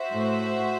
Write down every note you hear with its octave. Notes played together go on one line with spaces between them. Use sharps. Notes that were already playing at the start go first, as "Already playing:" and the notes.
Already playing: F#4 C5 E5
A2